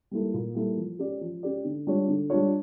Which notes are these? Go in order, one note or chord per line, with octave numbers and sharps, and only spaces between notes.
G3 A#3 E4 A4
A#2
G3 A#3 E4 A4
F3
C#4 G4 D5
F3
C#4 G4 D5
D3
G3 D4 F4 C#5
D3
G3 D4 F4 C#5